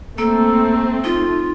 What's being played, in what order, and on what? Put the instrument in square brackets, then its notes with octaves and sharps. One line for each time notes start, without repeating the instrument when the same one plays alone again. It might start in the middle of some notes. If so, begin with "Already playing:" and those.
[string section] A3 C4 [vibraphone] A#3 E6 [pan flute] A4
[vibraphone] D#4 [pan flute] F4